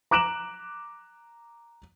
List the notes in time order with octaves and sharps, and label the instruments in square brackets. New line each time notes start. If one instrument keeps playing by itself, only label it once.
[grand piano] A#5 D6 F#6 D7 E7 F#7